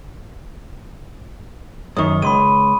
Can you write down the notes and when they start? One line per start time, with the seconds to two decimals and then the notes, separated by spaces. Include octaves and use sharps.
1.97 F#2 D#3 C#6 D#6
2.22 C#2 B5 C6 D#7